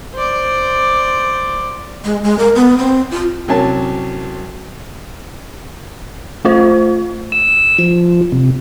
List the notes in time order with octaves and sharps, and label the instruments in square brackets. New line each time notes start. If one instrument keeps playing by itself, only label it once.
[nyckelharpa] C5 D5
[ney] G#3
G#3
A#4
B3
C4
F4
[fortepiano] C2 F#3 C#4 G#5 A5
[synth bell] A3 F4 C5
[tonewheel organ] E6
F3
C3